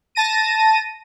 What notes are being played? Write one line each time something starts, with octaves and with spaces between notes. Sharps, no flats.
A5 A#6 D#7